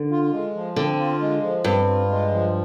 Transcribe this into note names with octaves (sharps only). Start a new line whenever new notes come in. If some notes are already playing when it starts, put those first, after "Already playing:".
Already playing: D3
F4
G#3
F3
D3 C4
F4
G#3
F3
G2 C4
F4
G#3
F3